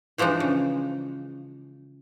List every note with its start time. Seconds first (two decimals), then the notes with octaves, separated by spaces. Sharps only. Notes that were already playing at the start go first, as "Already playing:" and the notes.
0.18 E3 F3 G#3 D4 D#4
0.40 C#3